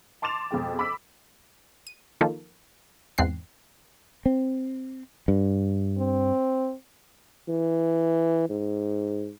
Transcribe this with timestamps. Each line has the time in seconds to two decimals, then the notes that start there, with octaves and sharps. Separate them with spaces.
0.22 A5 C6 D6 A6 E7 F7
0.51 F2 B2 G#3 G5
0.79 B5 D6 E6 B6
1.87 D#7
2.21 D#3 F3 A#3 D#4 A4
3.18 E2 G#2 C4 F#6 C7
4.26 C4
5.28 G2
5.98 C4
7.48 E3
8.50 G#2